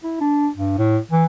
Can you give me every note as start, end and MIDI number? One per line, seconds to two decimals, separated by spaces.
0.04 0.20 64
0.20 0.47 62
0.57 0.74 43
0.78 0.98 45
1.11 1.25 52